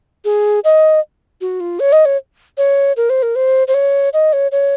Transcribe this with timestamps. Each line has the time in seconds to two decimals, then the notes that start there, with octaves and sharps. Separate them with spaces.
0.25 G#4
0.64 D#5
1.41 F#4
1.60 F4
1.80 C#5
1.92 D#5
2.05 C#5
2.58 C#5
2.97 A#4
3.10 C5
3.23 A#4
3.36 C5
3.68 C5
3.74 C#5
4.13 D#5
4.33 C#5
4.52 C#5